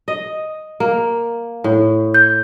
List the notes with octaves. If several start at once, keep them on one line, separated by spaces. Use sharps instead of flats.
D#5
A#3
A2
G6